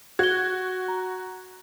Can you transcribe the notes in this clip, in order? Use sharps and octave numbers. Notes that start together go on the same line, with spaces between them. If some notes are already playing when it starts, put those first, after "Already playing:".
F#4 G#6 G7
A#5